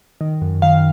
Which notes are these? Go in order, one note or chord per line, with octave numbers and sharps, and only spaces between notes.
D#3
F#2
D#3 F5